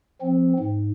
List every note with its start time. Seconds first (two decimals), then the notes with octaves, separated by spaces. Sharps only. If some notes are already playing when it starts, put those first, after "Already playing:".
0.21 F3 C4
0.59 G#2